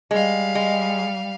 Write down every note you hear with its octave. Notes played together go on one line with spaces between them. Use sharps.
G3 G#3 F5
G#3